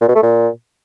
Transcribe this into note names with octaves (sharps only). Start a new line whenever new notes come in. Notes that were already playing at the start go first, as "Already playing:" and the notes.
A#2
B2
A3
A#2